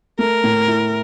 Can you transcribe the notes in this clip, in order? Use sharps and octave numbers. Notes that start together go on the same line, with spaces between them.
A3 A#4
A2
E4